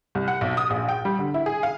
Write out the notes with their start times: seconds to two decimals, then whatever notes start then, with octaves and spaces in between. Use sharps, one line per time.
0.15 C2
0.28 F#5
0.41 B1
0.57 D#6
0.70 A#1
0.88 G5
1.05 G3
1.19 D3
1.34 E4
1.46 G#4
1.63 F5